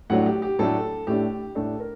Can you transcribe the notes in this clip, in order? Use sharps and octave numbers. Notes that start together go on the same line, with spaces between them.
A2 F#3 A3 D4 F#5
G4
G4
A2 F#3 A3 D4 A4
A2 A3 D4 G4
A2 A3 D4 A4
A#4